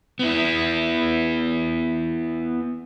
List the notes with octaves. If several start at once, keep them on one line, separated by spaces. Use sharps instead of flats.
B3 E4